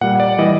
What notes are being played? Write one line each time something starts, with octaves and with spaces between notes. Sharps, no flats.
A#2 G3 F#5
D5
E3 G3 D#5